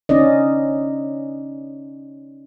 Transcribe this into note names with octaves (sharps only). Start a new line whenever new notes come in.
C#4 D#4 D5 D#5